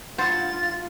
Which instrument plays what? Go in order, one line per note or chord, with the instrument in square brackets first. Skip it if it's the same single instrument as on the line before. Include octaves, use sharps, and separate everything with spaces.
[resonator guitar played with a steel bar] G2 F#5 [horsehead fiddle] F4 [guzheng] C5 C#5 [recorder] A6